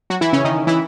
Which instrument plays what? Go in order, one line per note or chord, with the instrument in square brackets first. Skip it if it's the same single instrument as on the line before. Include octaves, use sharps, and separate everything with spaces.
[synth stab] F#3 F#4
E3 E4
C#3 C#4
D#3 D#4
E3 E4